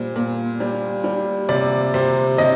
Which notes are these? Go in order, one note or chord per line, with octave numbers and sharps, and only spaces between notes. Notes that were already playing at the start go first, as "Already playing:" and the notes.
Already playing: A#2 G3 C5
A#2
G3
G3
C3 D5
C3 C5
C3 D#5